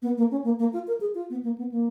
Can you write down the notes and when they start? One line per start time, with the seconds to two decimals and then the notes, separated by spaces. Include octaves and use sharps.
0.02 B3
0.17 A#3
0.31 C#4
0.44 A#3
0.59 A#3
0.73 F4
0.87 A#4
1.01 G#4
1.15 F4
1.30 B3
1.44 A#3
1.58 B3
1.72 A#3